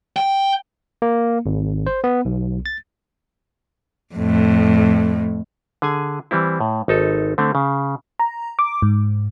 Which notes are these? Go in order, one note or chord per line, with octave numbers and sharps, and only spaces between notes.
G5
A#3
G#1
C5
B3
B1
A6
F2 A2
D3 G#4 G#5
E3 G3 C4 E4
A2
G#1 D#4 A4
D3 A3 C4
C#3
A#5
D6
G#2